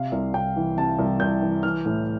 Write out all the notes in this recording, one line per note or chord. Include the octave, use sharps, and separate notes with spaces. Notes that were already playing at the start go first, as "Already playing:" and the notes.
Already playing: C3 F5
C2
C2 G5
E3
C3 A5
C2
C2 G6
E3
E3 F6
A2